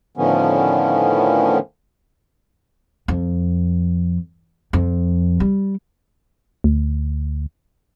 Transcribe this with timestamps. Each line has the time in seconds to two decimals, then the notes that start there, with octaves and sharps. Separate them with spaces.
0.17 A2 D3 D#3 F3 B3 C#4
3.08 F2
4.73 F2
5.40 G3
6.64 D2